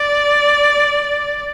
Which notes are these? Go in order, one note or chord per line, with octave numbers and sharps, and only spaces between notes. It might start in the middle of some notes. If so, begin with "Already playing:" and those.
Already playing: D5